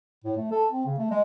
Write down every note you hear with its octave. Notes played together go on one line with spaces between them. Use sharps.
A2
A3
A4
C4
C#3
A3
G#3